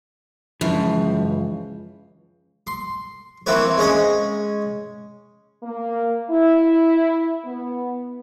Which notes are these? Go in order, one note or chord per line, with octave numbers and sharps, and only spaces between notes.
C#2 F#2 E3 F3
C6
E3 A#3 C4 E4 B4 C#5
G#3 C#4 D#5 G#5
A#3
E4
B3